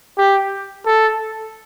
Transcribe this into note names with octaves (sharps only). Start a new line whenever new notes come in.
G4
A4